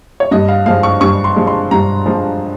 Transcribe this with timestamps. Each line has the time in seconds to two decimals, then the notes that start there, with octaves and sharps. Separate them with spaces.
0.20 C#5
0.31 G2 D#5
0.48 F5
0.66 F3 G#3 F5
0.83 C#6
1.01 G2 C#6
1.24 C6
1.36 F3 G#3
1.47 C6
1.71 G2 A#5
2.06 F3 G#3